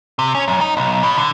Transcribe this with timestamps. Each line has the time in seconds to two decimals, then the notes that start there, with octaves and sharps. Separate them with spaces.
0.19 C3
0.35 C#4
0.48 F#2
0.61 D#4
0.77 B1
1.03 B2
1.18 D3